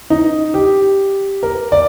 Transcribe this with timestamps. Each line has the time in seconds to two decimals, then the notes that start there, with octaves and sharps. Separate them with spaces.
0.10 D#4
0.54 G4
1.43 A#4
1.72 D5